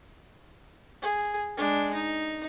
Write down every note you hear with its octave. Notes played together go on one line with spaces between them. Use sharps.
G#4
G#3 D4
D#4